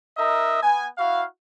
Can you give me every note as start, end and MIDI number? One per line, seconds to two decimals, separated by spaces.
0.17 0.60 63
0.17 0.60 70
0.17 0.60 75
0.17 0.60 76
0.61 0.86 59
0.61 0.86 80
0.97 1.23 64
0.97 1.23 66
0.97 1.23 77